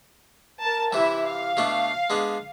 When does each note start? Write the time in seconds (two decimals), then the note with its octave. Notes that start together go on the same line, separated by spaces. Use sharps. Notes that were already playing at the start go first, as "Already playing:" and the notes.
0.61 A#4 A5
0.93 C3 E3 E4 E5
1.25 F5
1.57 B2 A3 D4
2.10 G#3 B3 D4